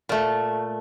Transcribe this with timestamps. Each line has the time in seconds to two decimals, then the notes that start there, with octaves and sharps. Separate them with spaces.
0.09 A#2 A3